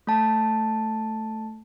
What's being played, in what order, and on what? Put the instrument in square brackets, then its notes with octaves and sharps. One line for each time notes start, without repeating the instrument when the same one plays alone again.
[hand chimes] A3 A5